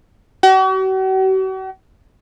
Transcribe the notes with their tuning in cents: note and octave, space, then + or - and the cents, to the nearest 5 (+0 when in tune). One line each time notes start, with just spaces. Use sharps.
F#4 +45